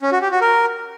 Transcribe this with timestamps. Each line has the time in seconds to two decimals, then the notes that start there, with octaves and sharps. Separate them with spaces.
0.02 C#4
0.12 F#4
0.22 G4
0.31 F#4
0.41 A#4